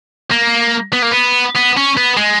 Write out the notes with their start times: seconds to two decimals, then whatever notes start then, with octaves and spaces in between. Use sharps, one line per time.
0.31 A#3
0.93 B3
1.03 A#3
1.11 B3
1.55 B3
1.77 C#4
1.97 B3
2.17 G#3